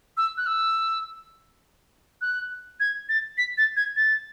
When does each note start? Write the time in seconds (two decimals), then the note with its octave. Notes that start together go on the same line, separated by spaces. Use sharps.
0.17 E6
0.37 F#6
0.46 E6
2.21 F#6
2.80 G#6
3.09 A6
3.38 B6
3.58 A6
3.76 G#6
3.96 A6